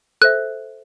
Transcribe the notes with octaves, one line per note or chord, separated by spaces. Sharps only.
A4 C5 E5 F#6